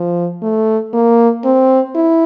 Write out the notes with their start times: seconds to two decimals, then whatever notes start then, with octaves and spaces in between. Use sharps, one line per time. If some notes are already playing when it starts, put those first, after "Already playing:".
Already playing: F3
0.43 A3
0.94 A#3
1.45 C4
1.95 E4